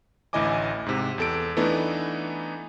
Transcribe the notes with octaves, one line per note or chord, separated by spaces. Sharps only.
A1 D2 E4 D#5 G#5 D6
G#2 C3
E2 A4 D7
E3 A3 B3 D4 D#4